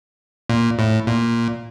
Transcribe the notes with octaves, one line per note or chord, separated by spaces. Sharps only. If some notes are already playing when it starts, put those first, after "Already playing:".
A#2
A2
A#2